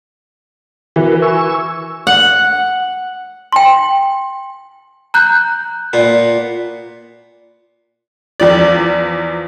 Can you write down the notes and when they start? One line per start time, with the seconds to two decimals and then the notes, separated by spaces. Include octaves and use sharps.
0.96 E3 F#4 A#4 B4
1.22 G#5 C#6 E6
2.07 F#5
3.52 G5 C6
5.14 A#5 F#6 G6
5.93 A#2 B3
8.40 E2 F3 D5